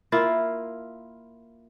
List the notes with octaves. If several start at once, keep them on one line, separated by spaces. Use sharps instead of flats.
A#3 E4 F4